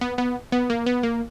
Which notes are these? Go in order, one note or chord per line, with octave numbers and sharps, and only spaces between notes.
B3
B3
B3
A#3
B3
A#3